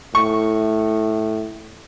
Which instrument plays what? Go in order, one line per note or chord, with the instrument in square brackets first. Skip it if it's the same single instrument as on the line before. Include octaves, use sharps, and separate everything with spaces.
[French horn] A2 [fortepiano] C#6